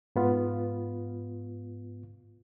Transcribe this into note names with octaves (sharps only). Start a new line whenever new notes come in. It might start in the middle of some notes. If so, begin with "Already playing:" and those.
G#2 B3 F4